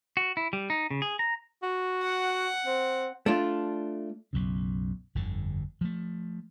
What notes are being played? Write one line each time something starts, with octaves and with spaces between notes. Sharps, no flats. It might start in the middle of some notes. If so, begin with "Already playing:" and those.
F#4
E4
G3
D#4
C#3
G#4
A#5
F#4
F#5
C4
A3 D4 F4
B1 F#2 C#3
G1 F2 D3
F3 A3